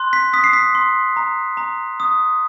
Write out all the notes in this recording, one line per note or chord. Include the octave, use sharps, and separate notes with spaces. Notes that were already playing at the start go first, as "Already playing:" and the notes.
Already playing: C6 F#6
B6
D#6 B6
C7
B6
C6
A#5
A#5
D#6